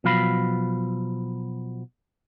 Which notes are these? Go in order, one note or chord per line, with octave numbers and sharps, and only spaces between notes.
B2 F3 F#3 F5 B5